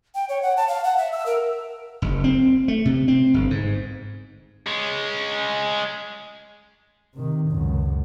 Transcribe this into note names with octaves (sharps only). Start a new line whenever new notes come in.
G5
C#5
F#5
A5
F5
F#5
E5
E6
A#4
F#1
C4
A3
C3
C4
G1
G#2
G#3 C#4
C3 D#3
C#2 F#2